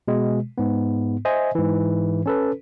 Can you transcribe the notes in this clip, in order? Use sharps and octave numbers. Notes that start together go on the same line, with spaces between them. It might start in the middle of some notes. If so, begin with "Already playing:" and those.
B2 G#3
G#2 B3
C5 D#5 E5 G#5
G#2 E3
C#4 A4 B4